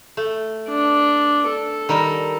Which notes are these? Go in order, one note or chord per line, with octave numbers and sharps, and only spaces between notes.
A3
D4
A4
D#3 G3 A#4